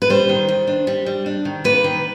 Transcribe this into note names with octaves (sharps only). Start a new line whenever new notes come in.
B4
G3 C5
D#3
D#3
D4
G3
G3
D4
D#3
A#3 B4
D#3